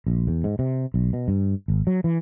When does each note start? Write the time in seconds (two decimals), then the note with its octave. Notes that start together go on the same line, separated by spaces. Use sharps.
0.07 A#1
0.27 E2
0.44 G#2
0.59 C3
0.94 B1
1.13 B2
1.28 G2
1.68 G#1
1.87 F#3
2.04 E3